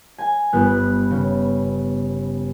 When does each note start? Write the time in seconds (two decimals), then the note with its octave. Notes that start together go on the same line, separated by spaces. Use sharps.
0.18 G#5
0.53 G1 B3 F#6
1.10 C#3